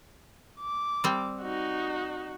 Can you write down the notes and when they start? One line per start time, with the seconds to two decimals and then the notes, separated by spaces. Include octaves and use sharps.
0.60 D6
1.04 G3 C4
1.41 D#4 F#4